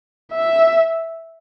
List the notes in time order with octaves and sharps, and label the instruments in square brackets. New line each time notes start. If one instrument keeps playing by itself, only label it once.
[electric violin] E5